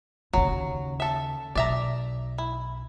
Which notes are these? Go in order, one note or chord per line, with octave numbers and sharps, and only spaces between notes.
D#2 C#3 F#3
A4 E5
B1 D5 E5 A#5
E4